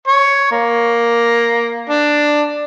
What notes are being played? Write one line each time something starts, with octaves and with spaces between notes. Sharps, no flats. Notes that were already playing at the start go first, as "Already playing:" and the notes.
C#5
A#3
D4